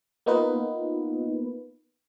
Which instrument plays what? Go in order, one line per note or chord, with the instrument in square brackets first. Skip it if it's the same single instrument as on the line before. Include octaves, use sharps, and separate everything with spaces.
[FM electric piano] A#3 B3 D#4 F4 B4